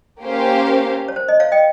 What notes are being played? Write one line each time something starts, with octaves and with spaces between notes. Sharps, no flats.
A#3 C#4 G4 C5 F5
C#5
C5
D#5
C#5 F5
D#5 G5